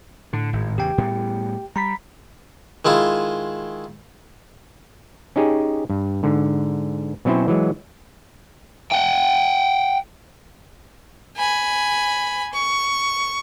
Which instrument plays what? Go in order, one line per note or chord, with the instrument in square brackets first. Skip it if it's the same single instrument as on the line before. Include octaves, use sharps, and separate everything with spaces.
[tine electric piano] A2 [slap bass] D3
[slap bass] G#1
[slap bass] E2 C#3 [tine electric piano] G4 G5
[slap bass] A2 G3 B3
[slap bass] G3 [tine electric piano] A#5 B5 B6
[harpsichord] D#3 G#3 E4 F4
[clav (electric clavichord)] C#4 D#4 G4 G#4
G2
G#2 D3
B2 F#3 C4 C#4 E4 C5
E3 F#3 G#3
[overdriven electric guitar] F#5 G5
[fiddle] G#5 B5
C#6